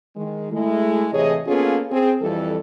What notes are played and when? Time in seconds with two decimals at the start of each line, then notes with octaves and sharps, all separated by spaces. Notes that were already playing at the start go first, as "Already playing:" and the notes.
0.16 D#3 G#3
0.52 G#3 A3 E4
1.13 A2 C3 E3 G#4 C#5 D#5
1.47 A#3 B3 C#4 F4 G#4 A4
1.91 C4 G#4
2.21 F2 E3 G3 A4